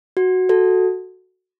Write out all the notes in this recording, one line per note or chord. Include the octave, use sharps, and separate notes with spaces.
F#4
F#4 A4